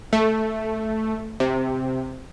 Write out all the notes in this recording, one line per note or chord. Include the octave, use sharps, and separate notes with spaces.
A3
C3